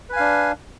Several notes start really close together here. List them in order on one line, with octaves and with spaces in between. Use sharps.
B4 G#5 F5 D4